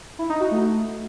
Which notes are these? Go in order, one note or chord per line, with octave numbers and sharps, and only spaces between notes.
E4
D#4
F#4
A3